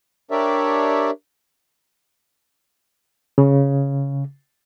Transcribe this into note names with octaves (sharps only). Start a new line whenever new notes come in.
D4 G4 A#4 C#5 D5 E5
C#3